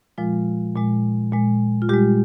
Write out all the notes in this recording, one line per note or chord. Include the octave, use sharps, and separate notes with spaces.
A#2 F3 G#3 F4
A#2 G#3
A#2 G#3
F4
A#2 G3 G#3 G4